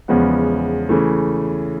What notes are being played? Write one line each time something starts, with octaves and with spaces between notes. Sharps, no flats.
E2 C#3 F3 G#3 B3
C#3 E3 A3